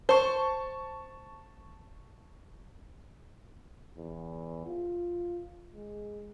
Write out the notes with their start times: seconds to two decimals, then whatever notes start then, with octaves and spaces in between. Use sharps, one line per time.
0.09 C5 A5 C#6
3.98 E2
4.67 F4
5.75 G#3